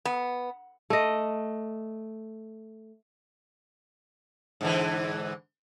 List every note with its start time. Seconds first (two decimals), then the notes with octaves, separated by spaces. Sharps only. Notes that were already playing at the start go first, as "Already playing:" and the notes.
0.05 B3
0.90 A3 D#5
4.61 G#2 D3 E3